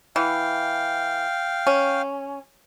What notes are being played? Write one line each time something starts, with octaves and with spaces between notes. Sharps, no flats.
E3 F5 G5
C#4